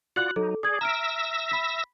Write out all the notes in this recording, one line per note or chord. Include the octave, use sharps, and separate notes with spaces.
F4 F#4 D5 F#5 F#6 F#7
F#3 D#4 A4
G#4 D5 D#6 G#6
E5 A#5 E6 F6 A#6 D7
B5 B6